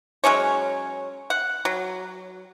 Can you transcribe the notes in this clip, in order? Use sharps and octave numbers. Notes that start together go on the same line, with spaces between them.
F#3 G#3 C#4 C#5
F#5
F#3